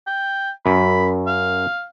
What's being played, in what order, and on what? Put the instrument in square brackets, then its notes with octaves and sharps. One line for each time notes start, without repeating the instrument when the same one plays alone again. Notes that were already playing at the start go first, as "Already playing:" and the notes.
[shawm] G5
[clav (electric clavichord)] F#2 [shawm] B5
[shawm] F5